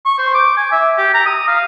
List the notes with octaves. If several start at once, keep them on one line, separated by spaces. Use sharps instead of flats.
C#6
C5
D6
G#5
E5
G4
A#5
D#6
F5